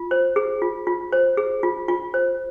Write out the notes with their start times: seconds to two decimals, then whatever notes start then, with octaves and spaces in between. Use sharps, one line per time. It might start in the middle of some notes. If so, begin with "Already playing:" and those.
Already playing: F4
0.11 C5
0.36 G#4
0.62 F4
0.87 F4
1.12 C5
1.37 G#4
1.63 F4
1.88 F4
2.14 C5